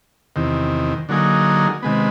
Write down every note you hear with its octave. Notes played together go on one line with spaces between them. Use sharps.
E2 C3 D#3
D3 F#3 A#3 D#4 G#4
C3 D#3 G#3 B3